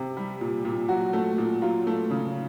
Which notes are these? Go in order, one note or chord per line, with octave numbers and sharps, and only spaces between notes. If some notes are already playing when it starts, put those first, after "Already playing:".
Already playing: C3
G3
A#2
A#2
F#3 F#4
A3
A#2
F#3 F4
A3
C#3